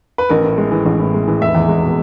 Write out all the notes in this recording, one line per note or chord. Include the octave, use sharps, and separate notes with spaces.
B4
A1 A#4
A2
G#3
E3
A1
A2
G#3
E3
F1 E5
E2
G#3
B2